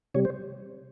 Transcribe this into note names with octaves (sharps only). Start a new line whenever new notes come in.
C3 G3 C#5
C5